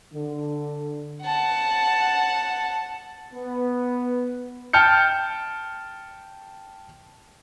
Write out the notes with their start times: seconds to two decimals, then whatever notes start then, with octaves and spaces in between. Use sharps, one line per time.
0.14 D3
1.23 F#5 A5
3.34 B3
4.73 G5 A5 F6 G6 C#7